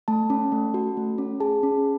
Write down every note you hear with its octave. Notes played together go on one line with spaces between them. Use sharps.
A3 A5
C#4
A3
F#4
A3
C#4
G#4 A5
C#4